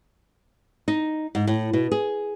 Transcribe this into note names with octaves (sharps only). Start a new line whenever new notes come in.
D#4
G#2
A2
B2
G#4